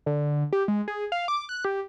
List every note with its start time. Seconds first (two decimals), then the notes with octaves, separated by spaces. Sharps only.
0.06 D3
0.53 G4
0.68 G#3
0.88 G#4
1.12 F5
1.28 D6
1.49 F#6
1.65 G4